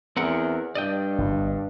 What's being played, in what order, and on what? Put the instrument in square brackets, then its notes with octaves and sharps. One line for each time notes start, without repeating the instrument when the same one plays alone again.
[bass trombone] E2 [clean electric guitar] C4 A#4 F#5
[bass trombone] G2 [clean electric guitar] D5 D#5 G5
[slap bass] G1